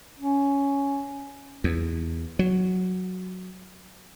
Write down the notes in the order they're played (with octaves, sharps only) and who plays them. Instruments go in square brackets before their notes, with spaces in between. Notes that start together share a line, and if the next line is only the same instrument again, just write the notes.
[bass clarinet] C#4
[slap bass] E2
F#3